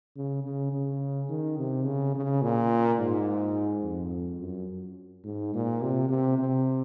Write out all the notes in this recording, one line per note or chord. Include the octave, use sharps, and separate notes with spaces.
C#3
C#3
C#3
D#3
C3
C#3
C#3
A#2
G#2
F2
F#2
G#2
A#2
C3
C3
C3